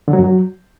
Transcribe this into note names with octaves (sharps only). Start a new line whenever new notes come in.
D3
F#3
F#2
F#3